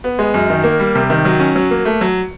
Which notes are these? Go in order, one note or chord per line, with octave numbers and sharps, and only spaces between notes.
B3
G#3
F#2
D#3
A#3
G3
C3
D#3
F#3
C#4
F#3
A#3
A3
F#3